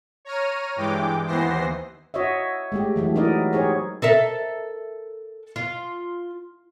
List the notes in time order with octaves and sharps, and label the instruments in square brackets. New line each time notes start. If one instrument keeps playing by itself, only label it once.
[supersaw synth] C#5 A#5 F6 D#7
G2 E3 G#3 G5 D6
D#2 E3 B3 C5 A#6 C7
[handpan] F#4 C#5 D#5 E5
G#3 A3 G4
E3 F#3 A3
F#3 D#4 E4 A#4 D5 D#5
D#4 G4 G#4 C5 C#5
[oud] A4 A#4 E5
F4